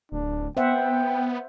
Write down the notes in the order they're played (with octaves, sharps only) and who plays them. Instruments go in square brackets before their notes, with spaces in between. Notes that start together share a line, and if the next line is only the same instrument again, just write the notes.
[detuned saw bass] D1 [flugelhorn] D4
[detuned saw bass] B3 [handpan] C5 E5 F#5 [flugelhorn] G5